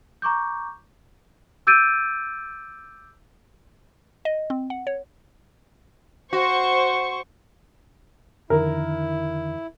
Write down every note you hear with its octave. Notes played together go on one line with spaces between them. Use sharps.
A#5 C#6 D6 G6
D6 E6 G6 A6 D7 D#7
D#5
C4
F#5
C#5
F#4 C5 C#6
F2 D3 D#3 E4 A#4